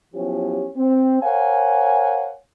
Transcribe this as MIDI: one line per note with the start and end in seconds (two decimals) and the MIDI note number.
0.14 0.67 53
0.14 0.67 54
0.14 0.67 59
0.14 0.67 61
0.14 0.67 64
0.14 0.67 67
0.77 1.19 60
1.23 2.33 70
1.23 2.33 72
1.23 2.33 73
1.23 2.33 77
1.23 2.33 78
1.23 2.33 80